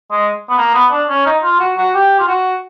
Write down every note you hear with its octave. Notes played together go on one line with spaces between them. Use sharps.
G#3
B3
A#3
B3
D4
C#4
D#4
F4
F#4
F#4
G4
F4
F#4